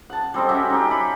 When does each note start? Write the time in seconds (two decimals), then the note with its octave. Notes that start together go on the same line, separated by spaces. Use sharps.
0.10 F#5 A5
0.34 G3 C4 A4 D#5
0.49 C#4 F#4 G4 E5
0.70 D#4 G4
0.91 B5